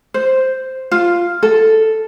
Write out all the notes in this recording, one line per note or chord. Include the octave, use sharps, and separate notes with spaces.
C5
F4
A4